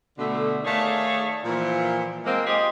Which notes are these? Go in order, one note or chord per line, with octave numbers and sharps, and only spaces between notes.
B2 D3 A3
D#3 A3 G#4 C#5 D5 F5
A#2 E3 F3
G#3 A#3 C4
F4 G4 G#4 C5 D#5